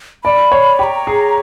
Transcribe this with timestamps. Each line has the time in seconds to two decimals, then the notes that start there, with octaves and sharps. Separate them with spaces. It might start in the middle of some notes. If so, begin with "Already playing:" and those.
0.24 D5 B5
0.52 C#5
0.79 G4 A#5 B5
1.07 G#4